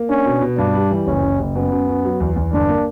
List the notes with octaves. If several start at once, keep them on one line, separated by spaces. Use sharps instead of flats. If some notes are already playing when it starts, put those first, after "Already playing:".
Already playing: A#3
C#4 D4
B2
B2
G2 D4
G3
E3
F#1 C#4
F#1
F#1
F#2 B3
F#2
F#2
F#3
E2
E2
G1 D4
A#3